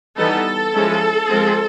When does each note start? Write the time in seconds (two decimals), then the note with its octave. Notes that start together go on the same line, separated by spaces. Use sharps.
0.16 E3 G3 B3 D#4 A4
0.72 F3 G#3 C#4 E4
1.28 F3 G#3 C4